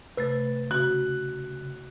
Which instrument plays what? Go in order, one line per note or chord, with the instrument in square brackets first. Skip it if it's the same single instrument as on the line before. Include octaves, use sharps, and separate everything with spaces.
[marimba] C3 A3 [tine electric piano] B4 A6
[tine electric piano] C#3 [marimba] F#4 [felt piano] F#6